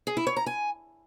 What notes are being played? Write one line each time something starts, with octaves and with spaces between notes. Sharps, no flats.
G#4
E4
C#5
A#5
G#5